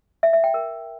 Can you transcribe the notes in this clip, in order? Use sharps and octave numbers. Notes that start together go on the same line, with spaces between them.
E5
E5
G5
A#4